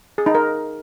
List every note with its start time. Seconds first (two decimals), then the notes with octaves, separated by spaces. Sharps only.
0.18 G#4
0.26 D#4
0.35 A#4